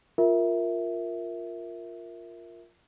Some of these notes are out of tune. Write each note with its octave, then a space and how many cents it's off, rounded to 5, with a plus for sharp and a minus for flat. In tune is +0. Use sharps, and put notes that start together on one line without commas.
F4 +0 A#4 +0 E5 +0